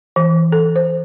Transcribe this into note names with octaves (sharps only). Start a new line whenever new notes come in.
E3
A4
C5